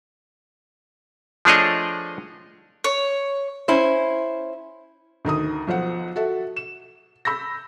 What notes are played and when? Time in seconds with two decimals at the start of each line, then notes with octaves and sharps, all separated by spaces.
1.45 F3 A3 D4 G#4 C#5 D#5
2.84 C#5
3.68 C#4 E4 C5
5.25 D2 D#3 A#5 D#6
5.67 B1 F3 C5 F#5
6.16 F#4 A4 E5
6.56 E7
7.25 B5 E6 G6 A#6